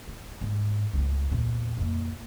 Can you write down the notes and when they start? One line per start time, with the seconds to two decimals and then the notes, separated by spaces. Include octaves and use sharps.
0.08 D1
0.41 G#2
0.93 C#2 A3
1.31 E2 A#2
1.77 F2 A#3